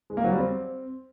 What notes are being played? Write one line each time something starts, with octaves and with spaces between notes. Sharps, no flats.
G#3
A#3
F#3
G3
C4